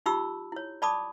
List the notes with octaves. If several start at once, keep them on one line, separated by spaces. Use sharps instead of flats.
D#4 F4 G4 B5 C#6 E6
E4 C#5
D5 A5 B5 D6 D#6